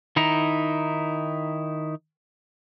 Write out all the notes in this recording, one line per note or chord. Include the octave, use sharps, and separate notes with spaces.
D#3 D#4 E4 A#5